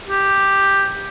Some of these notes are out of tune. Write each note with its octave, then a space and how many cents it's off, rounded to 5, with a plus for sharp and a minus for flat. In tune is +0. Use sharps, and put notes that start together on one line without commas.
G4 +5